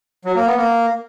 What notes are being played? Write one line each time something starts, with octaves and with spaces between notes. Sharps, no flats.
F#3
A#3
B3
A#3